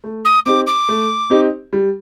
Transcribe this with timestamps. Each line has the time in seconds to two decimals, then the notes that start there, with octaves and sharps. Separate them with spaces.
0.04 A3
0.25 D#6
0.46 C4 D#4 G4 D6
0.67 D6
0.89 A3
1.30 C4 D#4 G4
1.73 G3